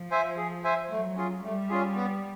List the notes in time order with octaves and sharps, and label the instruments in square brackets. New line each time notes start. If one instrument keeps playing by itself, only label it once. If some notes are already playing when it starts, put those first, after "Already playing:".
Already playing: [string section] F3
[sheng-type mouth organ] C5 E5 G#5
G#4
C5 E5 G#5
[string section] F#3 [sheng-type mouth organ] A3
[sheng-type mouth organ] C#4 F4 G#4
[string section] G3 [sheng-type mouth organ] A3
[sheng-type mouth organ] C#4 F4 G#4
B3